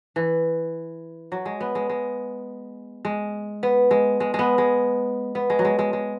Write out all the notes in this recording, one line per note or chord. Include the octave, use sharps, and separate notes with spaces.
E3
F#3
G#3
B3
G#3
G#3
G#3
B3
G#3
G#3
G#3 B3
G#3
B3
G#3
F#3
G#3
G#3
G#3